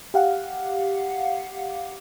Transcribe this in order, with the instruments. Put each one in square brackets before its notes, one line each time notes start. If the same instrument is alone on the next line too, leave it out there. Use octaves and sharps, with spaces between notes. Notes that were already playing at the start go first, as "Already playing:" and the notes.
[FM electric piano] G4 F5 F#5